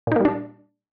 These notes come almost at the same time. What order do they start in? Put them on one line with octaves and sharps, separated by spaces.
A#2 D#4 A#3 G3 D4